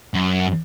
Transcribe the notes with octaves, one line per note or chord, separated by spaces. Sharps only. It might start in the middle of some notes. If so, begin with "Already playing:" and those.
F#2